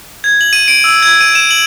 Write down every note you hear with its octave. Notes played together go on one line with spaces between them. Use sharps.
G#6
F#7
D#7
D7
E6
G#6
D#7
E7
F#7